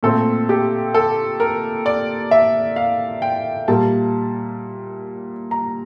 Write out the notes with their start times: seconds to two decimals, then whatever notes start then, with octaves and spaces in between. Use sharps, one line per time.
0.03 A#2 A3 C4 A4
0.49 G4
0.94 A4
1.40 A#4
1.86 D5
2.31 E5
2.76 F5
3.22 G5
3.68 A#2 G3 A#3 A5
5.51 A#5